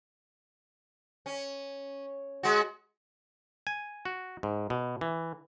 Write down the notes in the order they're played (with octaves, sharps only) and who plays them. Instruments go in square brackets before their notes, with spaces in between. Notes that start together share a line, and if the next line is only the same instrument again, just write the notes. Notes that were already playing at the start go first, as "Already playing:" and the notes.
[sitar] C#4
G#3 F#4
[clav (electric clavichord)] G#5
F#4
G#2
B2
E3